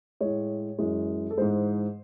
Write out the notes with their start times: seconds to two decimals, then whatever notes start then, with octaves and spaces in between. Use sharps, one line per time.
0.21 A2 G#3 C#5
0.78 F#2 E3 G#3
1.31 A4
1.37 G#2 E3 G#3 C5